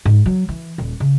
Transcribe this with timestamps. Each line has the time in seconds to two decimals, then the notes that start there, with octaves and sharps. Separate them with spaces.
0.05 G#2
0.26 F#3
0.49 E3
0.78 D#1
1.00 C#3